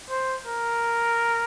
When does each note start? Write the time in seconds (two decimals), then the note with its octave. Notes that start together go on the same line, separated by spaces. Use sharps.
0.10 C5
0.47 A#4